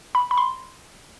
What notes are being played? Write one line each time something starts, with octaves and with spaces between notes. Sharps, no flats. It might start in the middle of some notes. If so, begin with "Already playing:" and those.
B5
B5
C6